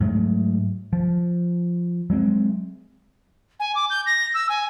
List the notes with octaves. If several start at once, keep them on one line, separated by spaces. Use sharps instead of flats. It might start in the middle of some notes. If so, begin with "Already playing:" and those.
G#2 F#3 A3
F3
F#3 G#3 A#3 C4
G#5
D6
G6
A#6
E6
G#5